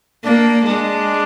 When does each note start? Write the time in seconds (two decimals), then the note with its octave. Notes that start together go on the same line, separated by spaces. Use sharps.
0.24 A#3 D4
0.66 G#3 D4